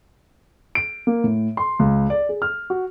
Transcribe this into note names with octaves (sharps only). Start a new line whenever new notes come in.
D7
A#3
A2
C6
C#2
D5
G#4
F6
F#4